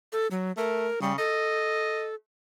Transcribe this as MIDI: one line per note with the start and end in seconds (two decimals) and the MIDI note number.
0.13 0.27 69
0.31 0.52 54
0.57 0.88 57
0.57 0.99 70
1.02 1.16 49
1.02 1.12 55
1.18 2.15 69
1.18 2.07 75